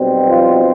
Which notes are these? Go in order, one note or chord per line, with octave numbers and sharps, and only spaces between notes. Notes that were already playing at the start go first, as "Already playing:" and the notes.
Already playing: B1 B2 G3 C4
F3 F4